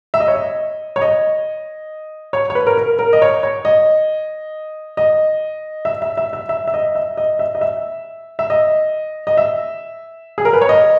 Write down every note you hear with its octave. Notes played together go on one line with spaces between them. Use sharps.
E5
D#5
C#5
D#5
C#5
D#5
C#5
C#5
B4
A#4
A#4
A#4
D#5
C#5
C#5
D#5
D#5
E5
E5
E5
E5
E5
E5
D#5
E5
D#5
E5
D#5
E5
E5
D#5
D#5
E5
G#4
A#4
B4
C#5
D#5